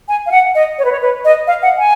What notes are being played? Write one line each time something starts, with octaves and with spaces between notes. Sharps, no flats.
G#5
F5
F#5
D#5
C#5
B4
C#5
B4
D#5
F5
F#5
G#5